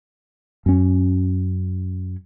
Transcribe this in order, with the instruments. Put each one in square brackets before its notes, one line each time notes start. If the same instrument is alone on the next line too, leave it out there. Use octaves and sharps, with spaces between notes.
[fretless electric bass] F#2 C#4